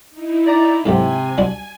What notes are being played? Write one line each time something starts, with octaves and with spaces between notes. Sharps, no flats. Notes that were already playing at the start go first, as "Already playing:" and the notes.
D#4 E4
D5 A#5
G#2 C3 F#3 A3 G#5
G3 D4 F#4